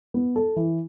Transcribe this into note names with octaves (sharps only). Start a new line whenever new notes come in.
B3
A4
E3